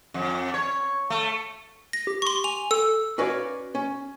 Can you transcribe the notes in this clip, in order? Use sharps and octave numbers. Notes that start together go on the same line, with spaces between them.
F2
C#5
A3
A#6
G4
C6 C#6
G#5 F7
A4 E6
C#4 F#4 B4 C#5 D5 F5
C#4